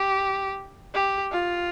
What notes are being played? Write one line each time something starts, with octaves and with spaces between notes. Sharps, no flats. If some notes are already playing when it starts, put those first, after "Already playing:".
Already playing: G4
G4
F4